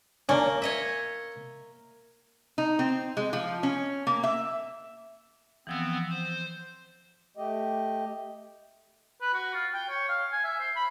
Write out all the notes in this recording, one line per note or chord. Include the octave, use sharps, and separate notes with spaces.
A#3 C#4 D4
C#5 D#5 E5
D#4
C4
G#3
F3
C#4
A#3
E5
E3 F3 B3 C4 E6
C5
A3 G4 D#5
B4
F#4
F4
G5
C#5
F5
G#5
E5
C5
B5